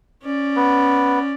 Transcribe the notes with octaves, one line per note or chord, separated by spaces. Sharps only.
C#4 D5
B3